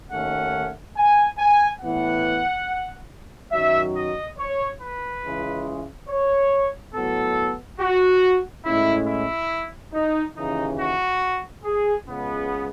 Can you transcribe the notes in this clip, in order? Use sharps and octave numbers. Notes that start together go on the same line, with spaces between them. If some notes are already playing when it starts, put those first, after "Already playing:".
D#2 D#3 A3 C#4 F#5
G#5
G#5
A2 E3 B3 F#5
F#2 D#3 F#3 E5
D#5
C#5
B4
C#2 C#3 E3 G#3
C#5
A2 F#3 B3 A4
F#4
A2 G#3 C#4 E4
E4
D#4
D#2 C#3 E3 D#4
F#4
G#4
C#2 C#3 G#3 B3